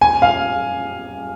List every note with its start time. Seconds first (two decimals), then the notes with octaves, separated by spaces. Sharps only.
0.01 G#5
0.22 F5